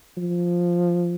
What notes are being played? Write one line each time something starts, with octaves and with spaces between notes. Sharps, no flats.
F3